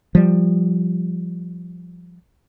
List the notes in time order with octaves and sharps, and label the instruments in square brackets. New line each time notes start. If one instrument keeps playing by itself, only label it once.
[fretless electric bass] F3 G3